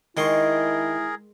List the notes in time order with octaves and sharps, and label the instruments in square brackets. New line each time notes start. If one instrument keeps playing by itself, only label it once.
[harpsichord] D#3 C6 C#6 [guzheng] G#3 [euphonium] E4 [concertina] G#4 A#4